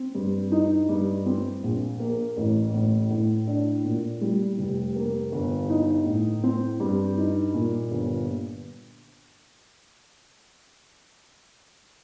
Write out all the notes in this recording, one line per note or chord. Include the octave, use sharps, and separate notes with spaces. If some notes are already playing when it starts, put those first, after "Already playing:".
Already playing: C4
G2
D#4
G2
C4
A#1
A#3
A1
A2
A2
D4
A#2
G3
F1
A#3
G1
D#4
A2
C4
G2
D#4
A#2
G1